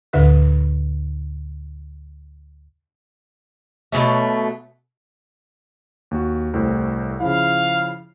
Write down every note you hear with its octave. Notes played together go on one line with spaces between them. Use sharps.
D2 A2 D3 B4 E5 F#6
B2 D3 F#3 A3
D#2 F#4
C2 A2 C4
C#3 F3 E4 F5